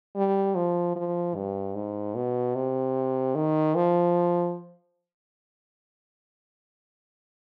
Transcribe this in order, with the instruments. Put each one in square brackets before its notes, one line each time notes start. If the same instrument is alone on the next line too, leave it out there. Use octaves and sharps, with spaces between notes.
[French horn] G3
F3
F3
G2
G#2
B2
C3
D#3
F3